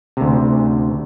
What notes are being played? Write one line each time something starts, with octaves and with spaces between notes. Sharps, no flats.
D2 C3